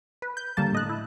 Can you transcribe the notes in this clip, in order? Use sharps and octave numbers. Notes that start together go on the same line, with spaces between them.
B4
G6
D3 G3 A#3 A5
A2 D#5 F#6
E4